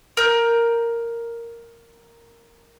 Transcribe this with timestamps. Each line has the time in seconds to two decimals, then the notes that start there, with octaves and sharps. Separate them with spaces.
0.17 A#4 G6